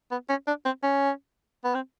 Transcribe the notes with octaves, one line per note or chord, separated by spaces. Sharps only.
B3
C#4
D4
C4
C#4
B3
C4